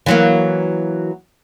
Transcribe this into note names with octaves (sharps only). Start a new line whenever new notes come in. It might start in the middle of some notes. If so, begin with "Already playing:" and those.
E3 F#3 A#3